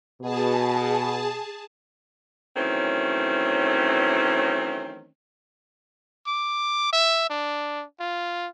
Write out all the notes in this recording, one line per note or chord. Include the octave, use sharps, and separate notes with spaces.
B2 G#4 A5
D#3 E3 F#3 A3 C4 C#4
D6
E5
D4
F4